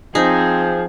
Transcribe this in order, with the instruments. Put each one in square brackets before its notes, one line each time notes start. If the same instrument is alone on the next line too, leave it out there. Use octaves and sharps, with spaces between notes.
[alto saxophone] F3 [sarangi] C4 [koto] D#4 [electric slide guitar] G#4